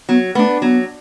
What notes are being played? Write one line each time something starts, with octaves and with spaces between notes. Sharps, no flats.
F#3 B3
A3 B3 D4
F#3 B3